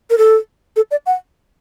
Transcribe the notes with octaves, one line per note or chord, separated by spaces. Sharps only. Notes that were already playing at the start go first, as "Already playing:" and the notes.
A#4
A4
A4
D5
F#5